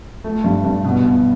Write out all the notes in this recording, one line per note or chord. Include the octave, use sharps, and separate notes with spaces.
A3
G2
G2
B2
B2